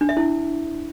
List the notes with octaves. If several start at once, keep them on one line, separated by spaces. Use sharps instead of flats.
D4
E5
E4